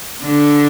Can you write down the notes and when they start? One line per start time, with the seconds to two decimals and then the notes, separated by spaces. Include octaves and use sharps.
0.22 D3